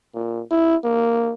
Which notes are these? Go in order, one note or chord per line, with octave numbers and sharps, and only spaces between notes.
A#2
E4
A#3